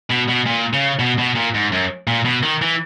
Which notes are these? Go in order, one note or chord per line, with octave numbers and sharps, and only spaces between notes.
B2
B2
A#2
C#3
B2
B2
A#2
G#2
F#2
A#2
B2
D#3
E3